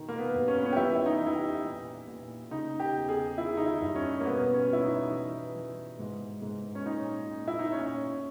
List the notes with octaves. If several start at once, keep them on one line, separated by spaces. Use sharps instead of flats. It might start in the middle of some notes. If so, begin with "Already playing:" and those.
Already playing: B2 D#3
A#3
B3
G2
C#4
B3
C#4
G4
E3 E4
E4
D#4
E3
E4
G4
A#2
A#2
C#3 D#4
G4
E2
G#4
D#3 E4
D#4
E4
G2
C#4
A#3
B2 B3
C#4
B2 E4
D#4
E3
E3
G#2
G#2
C#4
A#2 D#4
A#2
E4
D#4
A#2 C#4